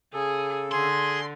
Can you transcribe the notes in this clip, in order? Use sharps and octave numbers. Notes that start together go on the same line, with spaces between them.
C#3 G#4 A4
D3 G#4 C6